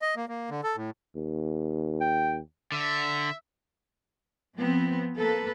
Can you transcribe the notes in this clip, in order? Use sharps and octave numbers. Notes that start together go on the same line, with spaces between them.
D#5
A#3
A#3
D3
A4
A2
D#2
G5
D3 E5
F3 B3 C4
A#3 A4 B4